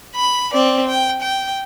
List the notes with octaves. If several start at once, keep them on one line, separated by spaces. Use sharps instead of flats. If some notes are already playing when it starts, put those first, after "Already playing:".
B5
C4 D5
G5
G5